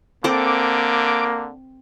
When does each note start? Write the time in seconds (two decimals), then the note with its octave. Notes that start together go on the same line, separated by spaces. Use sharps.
0.24 D3 A#3 C4 A4 C5 D6